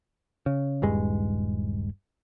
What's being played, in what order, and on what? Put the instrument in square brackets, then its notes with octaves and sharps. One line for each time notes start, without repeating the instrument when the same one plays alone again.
[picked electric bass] C#3
D#1 G2 G#3